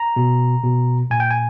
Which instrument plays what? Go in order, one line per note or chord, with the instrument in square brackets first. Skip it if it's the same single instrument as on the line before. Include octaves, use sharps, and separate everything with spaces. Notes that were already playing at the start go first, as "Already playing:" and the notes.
Already playing: [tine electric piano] A#5
B2
B2
A#2 G#5
G5
G#5